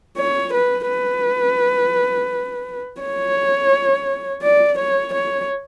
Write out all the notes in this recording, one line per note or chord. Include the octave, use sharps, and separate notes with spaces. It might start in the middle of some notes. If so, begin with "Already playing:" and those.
C#5
B4
B4
C#5
D5
C#5
C#5